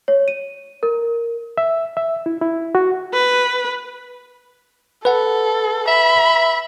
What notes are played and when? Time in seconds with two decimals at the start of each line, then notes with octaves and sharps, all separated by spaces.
0.08 C#5
0.28 D#7
0.83 A#4
1.58 E5
1.97 E5
2.26 E4
2.42 E4
2.75 F#4
3.13 B4
5.05 A4 B4 F#5
5.88 E5 B5